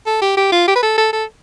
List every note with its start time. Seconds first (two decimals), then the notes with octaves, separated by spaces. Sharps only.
0.06 A4
0.22 G4
0.37 G4
0.52 F4
0.68 G4
0.76 B4
0.83 A4
0.98 A4
1.13 A4